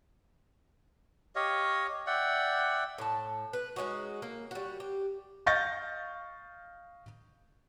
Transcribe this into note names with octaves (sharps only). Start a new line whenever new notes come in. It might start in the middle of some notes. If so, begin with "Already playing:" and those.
G4 C#5 D#5 F5
D5 E5 F#5 G5
A2 A5
B4
G#3 C#4 D#4 F#4
A#3
G3 F#4
G4
D#5 F5 C#6 G6 A6 A#6